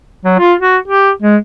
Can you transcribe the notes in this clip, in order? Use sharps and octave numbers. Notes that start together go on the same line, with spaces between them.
F#3
F4
F#4
G4
G#3